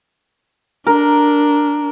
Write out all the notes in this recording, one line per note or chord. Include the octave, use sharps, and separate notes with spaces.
D4 A#4